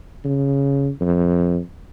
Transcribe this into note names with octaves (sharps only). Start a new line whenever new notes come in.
C#3
F2